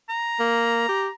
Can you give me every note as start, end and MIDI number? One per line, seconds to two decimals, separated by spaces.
0.09 1.15 82
0.39 0.87 58
0.89 1.08 67